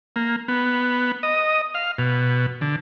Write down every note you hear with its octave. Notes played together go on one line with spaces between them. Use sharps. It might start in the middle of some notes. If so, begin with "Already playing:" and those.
A#3
B3
D#5
F5
B2
D3